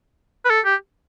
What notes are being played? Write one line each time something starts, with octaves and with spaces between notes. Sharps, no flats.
B4
A4
G4